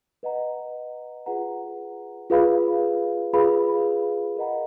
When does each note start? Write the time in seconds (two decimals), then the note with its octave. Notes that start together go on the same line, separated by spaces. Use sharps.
0.23 B4 D#5 F#5 A#5
1.26 F4 G#4 B4 F#5 A#5
2.30 F4 G#4 B4 F5 B5
3.33 F4 G#4 B4 F5 B5
4.36 A#4 D#5 F#5 A#5